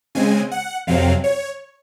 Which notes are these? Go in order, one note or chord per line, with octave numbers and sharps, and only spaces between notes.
C#3 G#3 C4 G#5
F#5
F2 C3 F#3 C4 F5
C#5